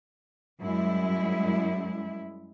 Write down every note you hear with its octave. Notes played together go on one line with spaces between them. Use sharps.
F#2 G3 G#3 E4